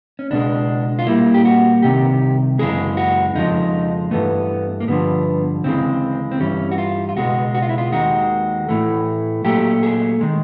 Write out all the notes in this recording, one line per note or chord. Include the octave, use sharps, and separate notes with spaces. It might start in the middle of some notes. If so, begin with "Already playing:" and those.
C#4
C#2 B2 G#3 D4
F4
A#2 G3 A#3 E4
G4
F#4
C2 C3 D#3 G4
F#2 C#3 E3 G#3 G#4
F#4
F2 C#3 F3 G#3 D#4
G2 E3 A3 B3
A#3
G2 D3 F3 B3
D2 C#3 E3 G#3 C4
C4
G2 E3 G3 C#4
F#4
F4
F4
C#2 B2 G#3 F#4
F#4
F4
E4
F4
D#2 D#3 G#3 F#4
A2 E3 A3
A#2 F#3 A3 G4
G#4
D#3 G#3